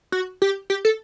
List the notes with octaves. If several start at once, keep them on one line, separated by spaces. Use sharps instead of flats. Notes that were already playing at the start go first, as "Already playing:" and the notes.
F#4
G4
G4
A4